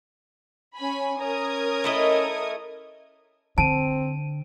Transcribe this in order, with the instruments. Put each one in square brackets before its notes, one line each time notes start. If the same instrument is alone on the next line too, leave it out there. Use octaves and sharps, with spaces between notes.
[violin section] C#4 G#5 B5
[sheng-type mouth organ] C#4 A#5 [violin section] A#4 D#6 G#6
[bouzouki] A3 E4 D#5
[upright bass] D3 [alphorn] C4 [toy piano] A5 [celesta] D7 D#7